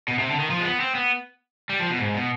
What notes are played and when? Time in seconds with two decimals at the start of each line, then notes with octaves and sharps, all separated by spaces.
0.08 B2
0.18 C3
0.29 D3
0.39 D#3
0.50 F3
0.60 G#3
0.64 B3
0.80 C4
0.95 B3
1.69 G3
1.79 F3
1.90 B2
1.99 G#2
2.15 B2